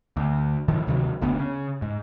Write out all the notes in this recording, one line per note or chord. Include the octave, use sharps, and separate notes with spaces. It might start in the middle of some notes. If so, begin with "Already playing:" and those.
D2
A2 D#3 F3
D2 C3 D#3 F#3
F1 D2 B3
C#3
G#2